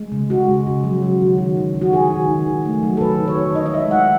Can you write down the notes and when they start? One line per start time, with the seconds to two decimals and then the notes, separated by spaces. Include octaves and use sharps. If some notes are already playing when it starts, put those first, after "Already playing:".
Already playing: G#3
0.12 C#3
0.30 G#3 F#4
0.48 C#3
0.66 C#3
0.84 F#3
1.02 F#3
1.21 D#3
1.38 D#3
1.57 D#3
1.75 F#3
1.81 F#4
1.92 D#3 G#4
2.10 D#3
2.28 D#3
2.46 D#3
2.65 A3
2.83 F#3
2.97 A4
3.01 D#3 B4
3.20 D#3
3.28 C#5
3.37 D#3
3.55 D#3 D#5
3.66 D#5
3.74 G#3 E5
3.91 D#3 F#5